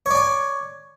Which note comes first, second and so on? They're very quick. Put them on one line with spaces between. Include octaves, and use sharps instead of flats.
C#5 D5 G#5